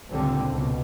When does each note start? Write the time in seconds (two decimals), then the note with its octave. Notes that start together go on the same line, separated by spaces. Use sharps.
0.12 C#2 A#2 D3 G3 C4
0.52 C#2 B2